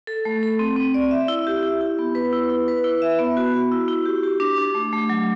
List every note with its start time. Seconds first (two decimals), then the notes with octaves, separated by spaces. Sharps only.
0.07 A4
0.25 A3
0.43 A4
0.59 C4
0.76 C4
0.94 D5
1.11 E5
1.28 E4
1.47 G4
1.63 E4
1.81 E4
1.99 B3
2.15 B4
2.33 E4
2.50 E4
2.68 B4
2.84 E4
3.02 E5
3.19 B3
3.37 F#4
3.54 F#4
3.72 E4
3.88 E4
4.06 G4
4.23 G4
4.40 D4
4.58 D4
4.75 A3
4.92 A3
5.10 F#3